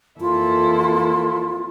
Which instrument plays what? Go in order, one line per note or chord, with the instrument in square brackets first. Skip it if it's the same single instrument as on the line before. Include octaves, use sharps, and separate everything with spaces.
[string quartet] F2 E3 A#3 E4 A4 [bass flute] F4